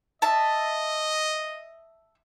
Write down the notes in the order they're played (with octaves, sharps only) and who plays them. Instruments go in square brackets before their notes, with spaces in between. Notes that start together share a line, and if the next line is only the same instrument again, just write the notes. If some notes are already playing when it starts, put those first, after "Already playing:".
[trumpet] D#5 [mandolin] E5 A5